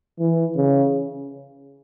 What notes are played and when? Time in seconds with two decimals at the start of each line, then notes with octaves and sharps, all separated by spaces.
0.19 E3
0.56 C#3